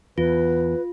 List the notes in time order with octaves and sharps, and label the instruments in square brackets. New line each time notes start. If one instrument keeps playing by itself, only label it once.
[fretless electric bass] E2 [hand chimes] F4 [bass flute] B4